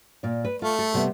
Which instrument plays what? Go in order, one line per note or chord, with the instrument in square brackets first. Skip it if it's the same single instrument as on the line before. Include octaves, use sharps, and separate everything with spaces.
[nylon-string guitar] A#2 D5
B4
[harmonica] A3 [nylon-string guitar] F4
[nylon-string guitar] A4
C3 G3 B3